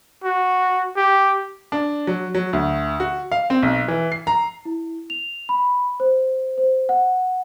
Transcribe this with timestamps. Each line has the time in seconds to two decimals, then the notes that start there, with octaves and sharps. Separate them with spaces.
0.24 F#4
0.96 G4
1.72 D4
2.07 F#3
2.35 F#3
2.53 D2
3.00 F#4
3.32 F5
3.50 C4
3.63 B1
3.88 E3
4.12 C7
4.27 A#5
4.65 E4
5.10 F7
5.49 B5
6.00 C5
6.58 C5
6.89 F#5